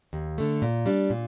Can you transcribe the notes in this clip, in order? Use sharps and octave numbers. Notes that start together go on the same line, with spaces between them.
D#2
D3 A3
A#2
G3 D4
A#2